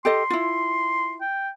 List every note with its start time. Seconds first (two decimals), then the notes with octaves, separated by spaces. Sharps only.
0.05 G4 A4 D#5 C6
0.30 E4 F4
1.21 G5